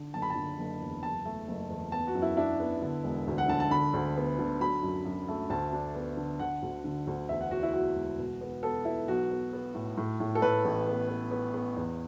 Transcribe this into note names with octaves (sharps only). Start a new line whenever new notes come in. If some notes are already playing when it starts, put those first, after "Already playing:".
Already playing: D3
F#1 A5
B5
A5
D3
F#1
E2
F#1 A5
A3
F#1
E2
B3 A5
F#4
F#2
E4
D4 E4
B3
D3
E1
D2
F#5
D3 A5
A5
D3 B5
D2
B3
D3
F#3 B5
F#2
F#2
A3
D2 A5
D4
B3
D3
D3 F#5
D2
D3
D2
E2 E5
F#5
E2 F#4
E4
F#3 F#4
E1
B2
B3
B3 A4
B3 E4
B1 F#4
B3
B3
A2
A2
A2
A4
A2 B4
A1
B3
B3
B3
B3
E2